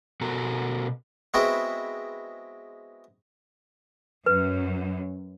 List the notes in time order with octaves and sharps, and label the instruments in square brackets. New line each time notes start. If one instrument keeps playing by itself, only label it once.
[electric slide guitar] B2 B3 F#4 A4 A#4 A#5
[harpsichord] G#3 B3 C4 E4 F#4 G5
[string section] F#2 [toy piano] B4